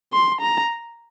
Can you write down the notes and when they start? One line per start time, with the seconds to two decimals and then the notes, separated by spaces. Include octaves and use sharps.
0.12 C6
0.41 A#5